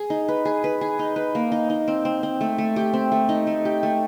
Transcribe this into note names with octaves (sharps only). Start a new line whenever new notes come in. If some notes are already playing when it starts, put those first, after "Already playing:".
Already playing: G#4
D#4
B4
G#4
B4
G#4
D#4
B4
A#3
D#4
D#4
C4
C4
C4
A3
A3
G4
C4
A3
D#4
A3
G4
A3